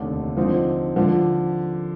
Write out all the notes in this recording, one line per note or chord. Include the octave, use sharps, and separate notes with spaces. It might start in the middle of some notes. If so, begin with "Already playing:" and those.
Already playing: F1 D#2 D3 A3 D#4
D3 F3 C4 D#4
D3 F3